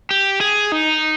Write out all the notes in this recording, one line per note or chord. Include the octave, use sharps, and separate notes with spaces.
G4
G#4
D#4